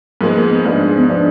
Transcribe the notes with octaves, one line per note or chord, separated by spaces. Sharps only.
G#2 F3 G#3 A#3 B3
A#3
B3
G#2 F3 G#3 B3 D4
B3
F3 G#3 B3 D4